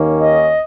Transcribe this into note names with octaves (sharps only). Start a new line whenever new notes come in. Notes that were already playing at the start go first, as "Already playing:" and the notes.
Already playing: D#2 D#3 A#3 C#4
D#5